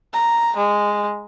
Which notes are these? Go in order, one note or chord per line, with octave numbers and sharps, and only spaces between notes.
A#5
G#3